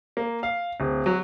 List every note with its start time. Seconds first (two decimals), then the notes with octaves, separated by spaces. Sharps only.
0.17 A#3
0.43 F5
0.80 D1
1.06 F#3